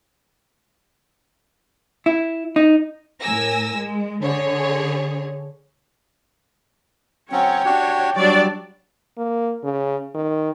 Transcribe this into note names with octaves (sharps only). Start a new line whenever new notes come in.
E4
D#4
A2 A#4 G#5 E6 A#6
G#3
D3 G#4 C#5
F#3 C4 C#4 C#5 G5
D4 F#4 G4
F#3 G3 D4 C#5 D5
A#3
C#3
D#3